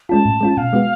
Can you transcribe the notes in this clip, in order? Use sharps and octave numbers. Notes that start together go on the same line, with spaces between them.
G#3 C#4 F4 A5
A2
G#3 C#4 F4
B2 F5
G#3 B3 F#4